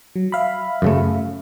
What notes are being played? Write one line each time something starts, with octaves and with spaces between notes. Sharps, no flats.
F#3
E5 F5 B5
F#2 C#3 A3